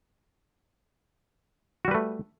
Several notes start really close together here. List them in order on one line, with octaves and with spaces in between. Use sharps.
F#4 G3 B4 A3